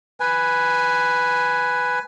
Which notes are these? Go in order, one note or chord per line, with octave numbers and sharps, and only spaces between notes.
B4 G#5